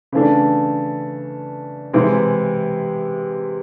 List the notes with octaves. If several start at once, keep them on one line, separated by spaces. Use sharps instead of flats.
C#3 E3 A3 D4
C3 E3 G#3